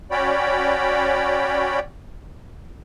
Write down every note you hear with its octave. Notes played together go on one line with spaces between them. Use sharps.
C#4 F#4 C#5 D5 G5 B5